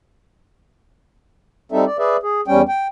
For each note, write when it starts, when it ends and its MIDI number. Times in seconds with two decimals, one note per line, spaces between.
1.72 1.85 55
1.72 1.85 60
1.72 1.85 63
1.72 1.85 69
1.72 1.85 76
1.86 1.99 74
1.99 2.17 68
1.99 2.17 71
1.99 2.17 74
1.99 2.17 76
2.23 2.41 68
2.48 2.62 40
2.48 2.62 55
2.48 2.62 61
2.48 2.62 79
2.68 2.87 79